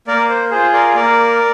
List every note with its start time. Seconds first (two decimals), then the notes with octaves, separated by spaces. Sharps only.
0.08 A#3 A#4 D5
0.30 C5
0.51 F4 G#4 C5
0.73 A#4 D5
0.95 A#3 A#4 D5